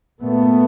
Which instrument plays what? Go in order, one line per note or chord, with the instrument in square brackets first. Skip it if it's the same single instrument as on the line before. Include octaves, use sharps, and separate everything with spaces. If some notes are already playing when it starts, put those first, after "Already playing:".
[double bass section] A#2 A3 B3